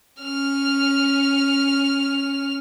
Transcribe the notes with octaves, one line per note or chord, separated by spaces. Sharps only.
C#4 F6